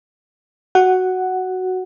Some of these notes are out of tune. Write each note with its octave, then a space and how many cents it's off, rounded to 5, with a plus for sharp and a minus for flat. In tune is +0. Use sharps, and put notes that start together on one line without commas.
F#4 +5 F#5 +5